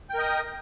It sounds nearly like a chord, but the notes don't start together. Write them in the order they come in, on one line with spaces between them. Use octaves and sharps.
G5 A#4 D#5